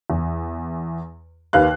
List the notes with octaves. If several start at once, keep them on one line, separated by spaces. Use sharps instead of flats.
E2
D#2 B4 F5 F#6